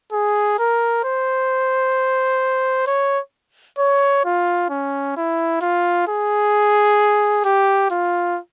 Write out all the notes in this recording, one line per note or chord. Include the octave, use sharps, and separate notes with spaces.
G#4
A#4
C5
C#5
C#5
F4
C#4
E4
F4
G#4
G4
F4